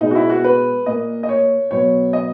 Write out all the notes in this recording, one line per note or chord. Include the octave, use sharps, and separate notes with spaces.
B2 G#3 B3 D#4
F#4
E4
F#4
B4
A#2 A#3 D#5
D#5
C#5
B2 F#3 B3 C#5
D#5